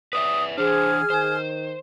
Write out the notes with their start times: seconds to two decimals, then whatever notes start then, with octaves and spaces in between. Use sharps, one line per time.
0.13 B4 D5 E5 D#6
0.58 E3 D4 G#4 C5 F6
1.10 D#3 C5